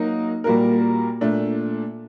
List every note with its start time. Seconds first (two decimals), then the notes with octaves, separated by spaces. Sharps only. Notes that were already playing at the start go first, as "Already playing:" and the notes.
Already playing: F#3 A#3 D#4 F#4
0.44 A#2 G3 A#3 F#4 A#4
1.21 A#2 A3 D4